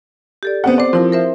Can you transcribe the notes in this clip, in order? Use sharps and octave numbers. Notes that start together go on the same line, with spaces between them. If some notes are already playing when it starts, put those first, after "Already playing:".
G4 A4 D5
B3 C4 F#5
C4 C5 D5
F3 C4 E4 A#4
A#4 C5 E5